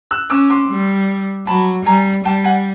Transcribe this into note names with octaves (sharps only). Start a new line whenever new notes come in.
E6 F#6
C#4 D6 E6
C6 D6
G3
F#3 A5 B5
G3 G#5 A#5
G3 G5 A5
F#5 G#5